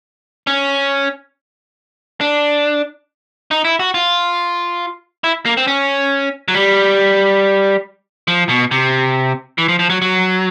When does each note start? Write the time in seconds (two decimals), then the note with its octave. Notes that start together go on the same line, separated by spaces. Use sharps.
0.47 C#4
2.21 D4
3.51 D#4
3.65 E4
3.80 F#4
3.94 F4
5.24 E4
5.45 A#3
5.57 C4
5.68 C#4
6.48 F#3
6.55 G3
8.28 F3
8.49 B2
8.71 C3
9.58 E3
9.68 F3
9.79 F3
9.90 F#3
10.02 F#3